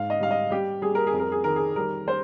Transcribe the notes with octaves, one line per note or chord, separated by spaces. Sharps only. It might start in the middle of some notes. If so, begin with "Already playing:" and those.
Already playing: G#2 F5
D#5
G3 F5
D#5
G3 G4
G3 G#4
A#4
G#4
F2
A#4
G#4
D#3 A#4
G#4
G3 A#4
G3 C5